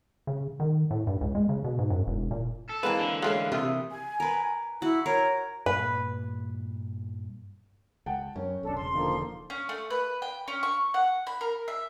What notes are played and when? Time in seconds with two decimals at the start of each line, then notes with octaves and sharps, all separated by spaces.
0.27 C#3
0.60 D#3
0.91 A2
1.07 G2
1.21 C#2
1.35 G#3
1.49 C#3
1.64 B2
1.79 G#2
1.90 F#2
2.07 E1
2.31 A#2
2.70 A4
2.83 E3 G#3 A#3 C4 B4 F5
3.00 D3
3.22 G#3 A3 C#4 F5 F#6
3.52 C3 F4 E5 D#6
3.91 G#5
4.20 A#4 B4
4.82 E4 F#4
5.06 A#4 C#5
5.66 G2 A#2 B4
8.06 C#2 F#5 G5 A5
8.36 F#2 C#4 C#5
8.63 D#1 B1 D4 A4
8.77 E1 C#3 C6
8.94 D3 F3 A#3 D#4 A4
9.50 C#4
9.69 A3
9.90 B4
10.22 G5
10.48 C#4
10.63 C#6
10.94 F#5
11.27 B5
11.41 A#4
11.68 E5